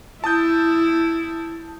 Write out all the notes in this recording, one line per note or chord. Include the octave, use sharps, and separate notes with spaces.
E4 A5 D#6 G6